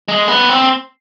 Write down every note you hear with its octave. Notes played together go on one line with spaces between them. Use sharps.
G#3
B3
C4